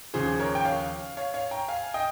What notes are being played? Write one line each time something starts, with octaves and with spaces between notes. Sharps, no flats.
D#2 C#3 F3 G#4 C5
A#4 C#5
G5
C#5 F5
C#5 F5
C#5 F5
G5 A#5
F5 G#5
D#5 G5